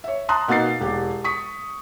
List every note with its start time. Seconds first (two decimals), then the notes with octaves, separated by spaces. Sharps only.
0.04 C#5 E5
0.29 A5 A#5 C6 D#6 F#6
0.48 B2 A#3 D#4 D#6 A6 C7
0.81 E1 G4
1.24 C#6 D#6 B6